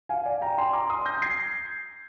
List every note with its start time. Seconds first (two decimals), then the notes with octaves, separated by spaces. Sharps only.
0.09 F5 G#5
0.25 D5 F5
0.41 G5 A#5
0.58 G#5 C6
0.73 A#5 D6
0.90 C6 D#6
1.06 G6 A#6
1.22 G#6 C7